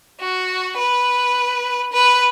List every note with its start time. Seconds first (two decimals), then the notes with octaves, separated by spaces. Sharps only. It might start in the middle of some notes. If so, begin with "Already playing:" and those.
0.20 F#4
0.77 B4
1.92 B4